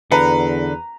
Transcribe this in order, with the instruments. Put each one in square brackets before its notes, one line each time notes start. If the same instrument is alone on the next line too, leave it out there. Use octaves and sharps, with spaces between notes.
[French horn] E2 [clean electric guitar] D3 [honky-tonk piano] B4 [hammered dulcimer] A#5